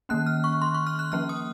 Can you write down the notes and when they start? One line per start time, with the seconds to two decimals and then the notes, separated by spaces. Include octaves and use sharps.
0.09 D#3 A#3 C#4 F#6
0.26 F6
0.44 C#6
0.61 C6
0.74 C#6
0.87 F6
0.99 F#6
1.12 F3 A#3 C#4 F6
1.29 D#6